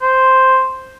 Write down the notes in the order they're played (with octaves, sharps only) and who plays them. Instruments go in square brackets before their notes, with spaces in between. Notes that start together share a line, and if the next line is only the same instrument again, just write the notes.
[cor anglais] C5